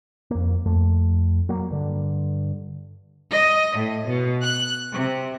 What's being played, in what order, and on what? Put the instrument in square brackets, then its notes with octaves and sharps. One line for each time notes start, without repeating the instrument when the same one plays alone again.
[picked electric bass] F2 A#3
F2 A3
F#3 A#3
G2 D3
[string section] D#5
A2
B2
F#6
C3